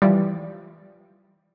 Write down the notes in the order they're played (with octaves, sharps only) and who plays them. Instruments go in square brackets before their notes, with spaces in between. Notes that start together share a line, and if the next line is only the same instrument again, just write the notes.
[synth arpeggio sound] E3 F3 G3